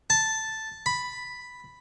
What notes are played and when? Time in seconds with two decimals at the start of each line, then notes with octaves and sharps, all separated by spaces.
0.10 A5
0.86 B5